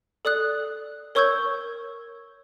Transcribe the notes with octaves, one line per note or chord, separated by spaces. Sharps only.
A4 D5 D#6 F#6
A#4 C#5 C#6 E6 G6 G#6